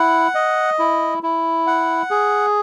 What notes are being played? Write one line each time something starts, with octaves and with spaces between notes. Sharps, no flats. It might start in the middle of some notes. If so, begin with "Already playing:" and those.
Already playing: E4 F#5
D#5
E4
E4
F#5
G#4